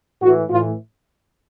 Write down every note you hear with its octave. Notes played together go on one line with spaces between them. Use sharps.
A2 E3 F#4
A2 E3 F4